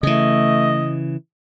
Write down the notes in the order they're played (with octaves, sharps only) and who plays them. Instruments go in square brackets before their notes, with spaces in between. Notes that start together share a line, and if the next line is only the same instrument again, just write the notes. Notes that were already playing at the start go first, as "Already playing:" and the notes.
[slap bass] C#3 E3 [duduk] A3 [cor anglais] D#5